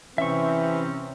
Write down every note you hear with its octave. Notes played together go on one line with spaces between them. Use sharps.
C3 E3 C4 C#4 E5 C#6